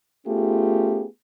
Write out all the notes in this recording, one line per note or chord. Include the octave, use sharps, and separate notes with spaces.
A3 B3 C#4 F4 G4 G#4